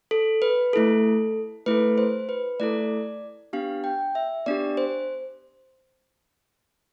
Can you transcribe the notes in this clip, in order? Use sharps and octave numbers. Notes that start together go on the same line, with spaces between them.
A4
B4
A3 E4 A4
A3 E4 A4 B4
C5
B4
A3 E4 A4 D5
B3 D4 G4 F5
G5
E5
B3 D4 G4 D5
C5